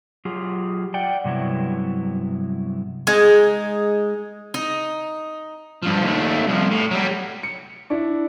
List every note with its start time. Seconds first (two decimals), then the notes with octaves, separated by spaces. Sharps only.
0.25 F#3 F4 G4 G#4
0.94 D5 F#5 G5
1.24 G2 C3 F#3 B3 E4
3.07 G#3 D#4
4.54 D#4
5.83 G2 F3
6.03 D#2 A3
6.47 C2 F3
6.71 A2
6.91 F#3 G3
7.43 C#7
7.90 D4 E4